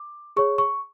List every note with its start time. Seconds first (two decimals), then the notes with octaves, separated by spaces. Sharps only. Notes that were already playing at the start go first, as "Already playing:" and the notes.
Already playing: D6
0.36 G#4 C#5 C#6
0.58 C#6